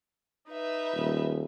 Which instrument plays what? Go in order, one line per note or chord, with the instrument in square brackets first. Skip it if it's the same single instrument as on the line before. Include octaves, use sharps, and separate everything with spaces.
[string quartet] D#4 B4 E5
[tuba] D#1